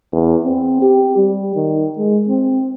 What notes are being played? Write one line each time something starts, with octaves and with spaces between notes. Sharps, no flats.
E2
C4
G4
G3
D#3
G#3
C4